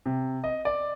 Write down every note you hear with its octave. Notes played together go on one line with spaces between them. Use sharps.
C3
D#5
D5